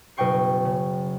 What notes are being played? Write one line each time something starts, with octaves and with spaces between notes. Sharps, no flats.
F#1 B2 D#5 G5 C#6 C7
C#3